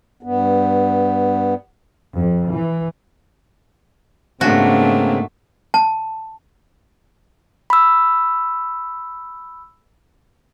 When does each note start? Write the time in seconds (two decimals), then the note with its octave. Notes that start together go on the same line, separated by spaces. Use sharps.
0.23 G2 B3
2.15 F2
2.48 E3
4.41 G#2 C#3 A3 A#3 C4 D4 F#4
5.74 A5
7.70 B5 E6